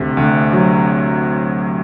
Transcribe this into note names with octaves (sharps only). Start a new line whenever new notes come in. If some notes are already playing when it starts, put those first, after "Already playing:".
Already playing: D2 C3
D2
F#3